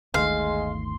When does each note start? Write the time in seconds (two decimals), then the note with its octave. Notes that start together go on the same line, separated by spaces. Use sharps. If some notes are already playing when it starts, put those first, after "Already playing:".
0.14 G1 D2 D#3 G#3 A3 F5 C6